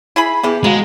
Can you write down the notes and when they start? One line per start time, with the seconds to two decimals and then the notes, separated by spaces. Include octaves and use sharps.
0.16 E4 G#4 B5
0.43 E3 B3 G4 G#4
0.64 F#3 G#3 F#4 F5